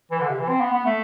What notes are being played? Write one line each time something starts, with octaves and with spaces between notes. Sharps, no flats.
E3
D3
C3
E3
C4
B3
B3
A3